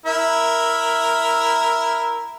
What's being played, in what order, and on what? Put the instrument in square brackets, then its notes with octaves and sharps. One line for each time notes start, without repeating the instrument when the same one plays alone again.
[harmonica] E4 A#4 E5